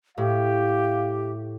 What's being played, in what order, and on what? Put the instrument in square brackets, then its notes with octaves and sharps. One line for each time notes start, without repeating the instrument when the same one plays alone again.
[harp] A2 [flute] G4 [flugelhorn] F5